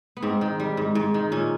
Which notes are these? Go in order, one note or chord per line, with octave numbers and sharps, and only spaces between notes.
B3
G#2 C4
D#3
G3
G#2
G#2
D#3
A#2 C#4